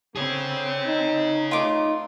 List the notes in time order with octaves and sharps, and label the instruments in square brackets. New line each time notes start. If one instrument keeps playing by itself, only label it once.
[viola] D3 C4 [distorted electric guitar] G#4 C#5
[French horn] D#4
[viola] A3 [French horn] D#4 [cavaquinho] F4 D6